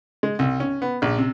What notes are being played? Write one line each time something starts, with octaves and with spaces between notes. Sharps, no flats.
G#3
C2
C#4
B3
A#1
C3